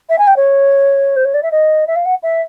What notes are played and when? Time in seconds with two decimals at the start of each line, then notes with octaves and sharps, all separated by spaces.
0.09 E5
0.18 G#5
0.27 G5
0.36 C#5
1.16 C5
1.25 C#5
1.34 D5
1.43 E5
1.51 D#5
1.87 E5
1.96 F5
2.05 F#5
2.23 E5